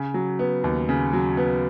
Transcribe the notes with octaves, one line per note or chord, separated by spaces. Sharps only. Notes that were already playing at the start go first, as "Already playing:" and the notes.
Already playing: C#3
F#3
B3
D#2
C#3
F#3
B3